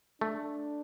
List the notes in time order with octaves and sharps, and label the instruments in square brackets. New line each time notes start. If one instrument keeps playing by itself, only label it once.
[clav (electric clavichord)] A3 [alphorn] D4